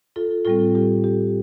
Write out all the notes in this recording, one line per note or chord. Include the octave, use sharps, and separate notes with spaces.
F4 A4
A2 G3 C4 F4 A4
G4
G4